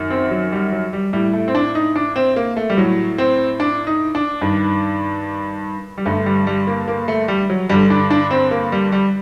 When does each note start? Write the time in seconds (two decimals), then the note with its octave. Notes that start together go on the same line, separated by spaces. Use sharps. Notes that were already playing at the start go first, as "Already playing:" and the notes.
Already playing: F#2 D#3
0.10 C4
0.31 F#3
0.52 G3
0.73 F#3
0.93 G3
1.13 A2 G3
1.33 A3
1.48 C4
1.55 D4
1.75 D#4
1.96 D4
2.16 C4
2.36 A#3
2.57 A3
2.70 G3
2.77 A2 F#3
3.18 C4
3.60 D4
3.87 D#4
4.15 D4
4.41 G2 D#3
5.97 G3
6.06 G2 D3 A3
6.26 G3
6.47 G3
6.67 A#3
6.88 A#3
7.08 A3
7.28 G3
7.50 F#3
7.69 G2 D3 G3
7.90 D4
8.11 D4
8.31 C4
8.51 A#3
8.72 G3
8.92 G3